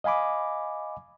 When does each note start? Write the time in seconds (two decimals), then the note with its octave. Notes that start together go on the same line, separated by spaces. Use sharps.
0.04 D#5 F5 G#5 B5 D6